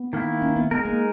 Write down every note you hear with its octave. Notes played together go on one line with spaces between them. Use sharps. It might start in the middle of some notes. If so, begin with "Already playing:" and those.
Already playing: B3
D#3 A#3 E4
C#4
B3
G#3 B3 D#4 A#4
A#3